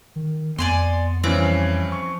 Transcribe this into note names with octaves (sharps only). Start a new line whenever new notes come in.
D#3
F2 B3 D5 G#5 C6
G2 E3 F3 C4 C#4
C#6